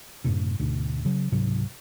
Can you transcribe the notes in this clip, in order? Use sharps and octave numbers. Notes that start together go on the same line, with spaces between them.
F#1 F#2 A2 C3
D2 G#2 B2 D3
C#3 F#3
C#2 G#2 C3 F#3